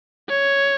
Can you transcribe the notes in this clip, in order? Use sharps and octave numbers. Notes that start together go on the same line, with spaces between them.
C#5